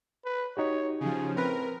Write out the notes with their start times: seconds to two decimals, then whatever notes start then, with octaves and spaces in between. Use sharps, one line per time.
0.25 B4
0.57 D#4 F#4 G4 C#5
1.01 C#3 F3 G#4
1.36 A2 C4 A#4 B4